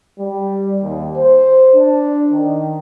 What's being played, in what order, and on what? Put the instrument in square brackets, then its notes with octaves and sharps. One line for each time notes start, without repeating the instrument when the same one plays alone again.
[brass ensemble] G3
D#2
C5
D4
D#3